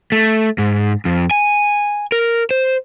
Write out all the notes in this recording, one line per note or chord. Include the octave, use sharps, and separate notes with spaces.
A3
G#2
F2
G#5
A#4
C5